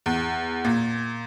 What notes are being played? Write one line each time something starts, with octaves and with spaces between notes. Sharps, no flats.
E2
A#2